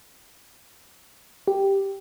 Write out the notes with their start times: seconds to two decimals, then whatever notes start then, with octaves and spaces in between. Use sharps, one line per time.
1.47 G4